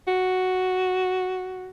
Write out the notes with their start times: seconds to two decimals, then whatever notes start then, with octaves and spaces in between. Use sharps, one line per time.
0.08 F#4